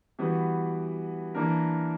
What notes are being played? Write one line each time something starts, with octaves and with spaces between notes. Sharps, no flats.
E3 G3 B3 F#4 B4
E3 A#3 D4 A#4